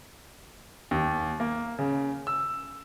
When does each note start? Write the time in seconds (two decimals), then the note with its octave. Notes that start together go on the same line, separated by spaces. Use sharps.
0.91 D#2
1.40 A#3
1.79 C#3
2.27 E6